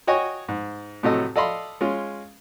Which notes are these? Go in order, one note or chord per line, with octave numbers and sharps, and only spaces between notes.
F#4 C#5 D#5 G5 G#5 C#6
G#2
A2 C3 F#3 A3 A4 D#5
A4 D5 D#5 F5 B5 C6
G#3 C#4 F4